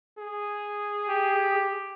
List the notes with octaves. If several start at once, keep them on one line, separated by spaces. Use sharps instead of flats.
G#4
G4